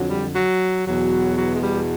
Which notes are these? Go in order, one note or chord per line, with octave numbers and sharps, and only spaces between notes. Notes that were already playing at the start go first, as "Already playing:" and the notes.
Already playing: F2 D3 F#3
G3
F#3
E2 B2 F#3
F#3
G#3
G3